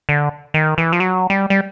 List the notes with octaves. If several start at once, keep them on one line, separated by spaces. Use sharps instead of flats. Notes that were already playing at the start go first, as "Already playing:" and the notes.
D3
D#3
E3
F3
F#3
G3
G3